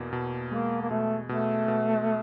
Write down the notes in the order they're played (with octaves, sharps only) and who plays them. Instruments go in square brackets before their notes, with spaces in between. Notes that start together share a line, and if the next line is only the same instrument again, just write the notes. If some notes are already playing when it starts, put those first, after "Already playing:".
Already playing: [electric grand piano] E2 B2 A#3
B2
[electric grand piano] G#3 [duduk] A#3
[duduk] A#3
[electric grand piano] B2 [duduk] A3
[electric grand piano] B2 [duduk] A3
[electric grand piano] B2